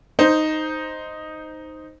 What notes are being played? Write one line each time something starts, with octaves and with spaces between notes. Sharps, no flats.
D#4 C5